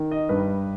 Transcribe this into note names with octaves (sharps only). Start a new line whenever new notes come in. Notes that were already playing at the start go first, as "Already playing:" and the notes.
Already playing: D#3
D#5
G2 B4